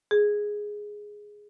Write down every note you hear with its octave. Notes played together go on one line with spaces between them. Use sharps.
G#4